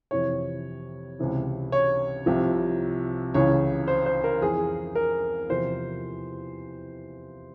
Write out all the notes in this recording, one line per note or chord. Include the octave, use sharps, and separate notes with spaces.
F2 C3 E3 C#5
C#2 C3 E3
C#5
C2 C3 F3
C#2 C#3 E3 C#5
C5
C5
A#4
F2 E3 G#4
A#4
E2 C3 F3 C5